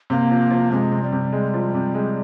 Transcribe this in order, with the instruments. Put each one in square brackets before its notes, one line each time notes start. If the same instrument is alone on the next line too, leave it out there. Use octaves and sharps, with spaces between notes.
[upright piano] C3 [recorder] A#3
[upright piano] F3
F3
[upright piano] C3 [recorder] G#3
[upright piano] C3
[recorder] G3
[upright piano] C3
G#3
F3
C3
G#3